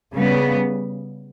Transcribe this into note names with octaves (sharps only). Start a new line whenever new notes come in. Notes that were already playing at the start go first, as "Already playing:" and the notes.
C#3 G3 B3